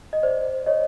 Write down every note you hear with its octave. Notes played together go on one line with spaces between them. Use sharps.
D#5
C5 D5
C#5 D#5